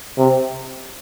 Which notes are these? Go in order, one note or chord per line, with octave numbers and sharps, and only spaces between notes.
C3